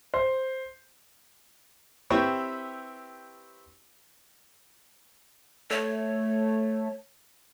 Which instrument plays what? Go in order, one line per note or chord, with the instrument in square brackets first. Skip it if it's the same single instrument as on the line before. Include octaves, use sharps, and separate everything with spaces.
[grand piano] C5
[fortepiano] C4 E4 G4 B4 C#5
[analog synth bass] A3 [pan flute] C#5